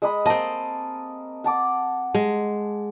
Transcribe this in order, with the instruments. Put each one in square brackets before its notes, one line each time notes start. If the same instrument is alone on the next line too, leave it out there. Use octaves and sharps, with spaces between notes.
[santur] G#3 D#5 B5
[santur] A#3 A5 [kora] C4 D#5
[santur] F#5 A5 D6
[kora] G#3